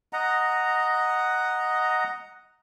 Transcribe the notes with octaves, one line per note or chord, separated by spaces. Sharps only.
D#5 F#5 A#5